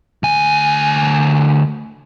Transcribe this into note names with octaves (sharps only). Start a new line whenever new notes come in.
D2 G#5